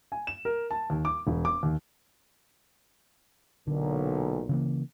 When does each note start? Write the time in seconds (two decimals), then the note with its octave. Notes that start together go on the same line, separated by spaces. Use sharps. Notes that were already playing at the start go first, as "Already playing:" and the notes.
0.12 G#5
0.27 E7
0.45 A#4
0.71 A5
0.90 D#2
1.05 D6
1.27 E1
1.45 D6
1.63 D#2
3.67 B1 A#2 D3
4.49 C#3 E3 A#3